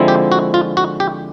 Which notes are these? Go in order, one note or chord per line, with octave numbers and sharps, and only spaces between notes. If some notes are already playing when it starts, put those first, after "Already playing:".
Already playing: D3 F3 G#3 C4 E4
G4
F#4
F4
F#4
G4